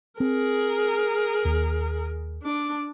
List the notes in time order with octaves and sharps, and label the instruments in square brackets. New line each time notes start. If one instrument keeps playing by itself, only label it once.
[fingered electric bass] C4 [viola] G#4 A#4
[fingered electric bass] D#2
[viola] D4 D6